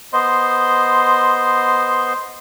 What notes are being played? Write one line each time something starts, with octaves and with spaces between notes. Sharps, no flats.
B3 C5 D#5 C6